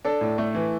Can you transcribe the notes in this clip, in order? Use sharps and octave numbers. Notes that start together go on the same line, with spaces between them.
D4 A4
A2
A3
E3